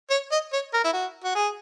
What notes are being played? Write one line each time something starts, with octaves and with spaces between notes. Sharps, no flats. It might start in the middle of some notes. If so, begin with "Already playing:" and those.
C#5
D#5
C#5
A#4
E4
F#4
F#4
G#4